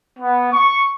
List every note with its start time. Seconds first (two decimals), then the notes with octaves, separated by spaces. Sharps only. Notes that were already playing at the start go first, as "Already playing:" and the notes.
0.19 B3
0.52 C#6